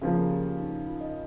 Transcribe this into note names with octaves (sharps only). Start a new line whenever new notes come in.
C#3 F3 A#3 G#4
G4
D#4
D#4
F4
D#5